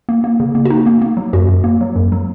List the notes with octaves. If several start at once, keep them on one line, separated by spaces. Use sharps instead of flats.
A#3
A#3
C#3
A#3
F#4
A#3 D#4
A#3
A#3
F#3
F#2 F#4
F#2
A#3
F#3
F#2
F#3